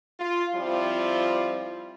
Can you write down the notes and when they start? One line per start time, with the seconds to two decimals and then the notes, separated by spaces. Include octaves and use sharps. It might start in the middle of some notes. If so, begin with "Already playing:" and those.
0.20 F4
0.55 F3 G3 C4 E4 F4